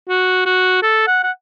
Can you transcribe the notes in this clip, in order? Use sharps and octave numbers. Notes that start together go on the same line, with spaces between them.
F#4
F#4
A4
F#5
F#5